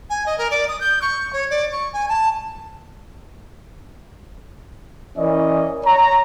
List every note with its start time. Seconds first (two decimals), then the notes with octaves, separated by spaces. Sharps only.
0.09 G#5
0.26 D#5
0.38 A#4
0.51 D5
0.68 D#6
0.80 G6
1.01 C#6
1.33 C#5
1.50 D5
1.72 C#6
1.93 G#5
2.09 A5
5.18 E3 C#4 A#4 D5 D#5
5.85 C#5 A#5